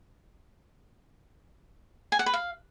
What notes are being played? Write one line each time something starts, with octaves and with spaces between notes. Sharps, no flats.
G#5
F#5
B4
F5